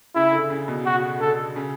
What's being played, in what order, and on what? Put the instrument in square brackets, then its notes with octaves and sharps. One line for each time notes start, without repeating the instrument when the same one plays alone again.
[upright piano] C#3 [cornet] E4
[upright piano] D3
C#3
B2
[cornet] F#4
[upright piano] D3 [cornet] A4
[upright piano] C#3